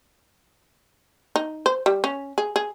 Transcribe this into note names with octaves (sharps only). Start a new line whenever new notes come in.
D#4
C5
G3
C#4
G#4
G#4